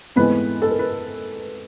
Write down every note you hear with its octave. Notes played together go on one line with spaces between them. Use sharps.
G#2 E3 A3 B3 C4 B4
A4
A#4
B4